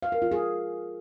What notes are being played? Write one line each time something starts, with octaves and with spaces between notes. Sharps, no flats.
F5
A#4
F4
G#4